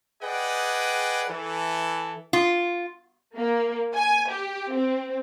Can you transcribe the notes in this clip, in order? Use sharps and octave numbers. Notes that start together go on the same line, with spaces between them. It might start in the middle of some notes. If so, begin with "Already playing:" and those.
G#4 B4 D5 D#5 F#5 G5
E3 A4
F4
A#3
G#5
G4
C4